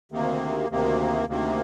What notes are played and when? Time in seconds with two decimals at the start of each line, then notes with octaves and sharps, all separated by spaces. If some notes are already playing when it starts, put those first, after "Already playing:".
0.12 D2 C3 D#3 A#3
0.70 D2 C3 D#3 A#3
1.27 D2 C3 D#3 A#3